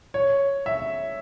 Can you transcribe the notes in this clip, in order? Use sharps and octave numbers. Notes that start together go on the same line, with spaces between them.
C#5
E5